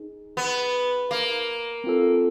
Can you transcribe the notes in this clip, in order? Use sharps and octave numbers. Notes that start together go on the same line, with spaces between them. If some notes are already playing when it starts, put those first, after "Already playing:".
Already playing: D#4 G#4
B3
A#3
C4 F4 A4